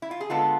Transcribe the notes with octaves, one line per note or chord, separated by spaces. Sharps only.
E4
F4
G#4
D3 G#3 B3 F4 A4